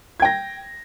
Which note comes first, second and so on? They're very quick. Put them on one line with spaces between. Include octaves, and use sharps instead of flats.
G#6 G5 A#6